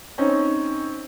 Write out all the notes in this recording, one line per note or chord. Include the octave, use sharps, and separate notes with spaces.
C4 C#4 D#4